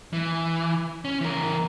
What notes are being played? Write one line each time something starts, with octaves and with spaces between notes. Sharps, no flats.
E3
C#4
E3 A#4